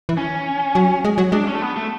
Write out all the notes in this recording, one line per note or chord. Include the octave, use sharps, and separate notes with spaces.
E3
C#4
F#3
G#3
F#3
G#3 D4
C#4
A3
B3
A3